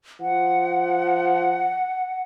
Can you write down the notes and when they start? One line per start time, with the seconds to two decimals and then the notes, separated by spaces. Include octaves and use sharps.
0.21 F3 F#5